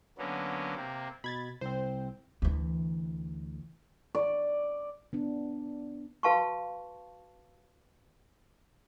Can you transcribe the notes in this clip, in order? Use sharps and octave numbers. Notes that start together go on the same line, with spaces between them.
D3 F#3 A#3 B3 C#4
C3 A#3 C4
B2 B5 G#6 A6
C2 C4 C5
D2 E3
D5
B3 D4
F#4 B4 F5 A5 C6 C#6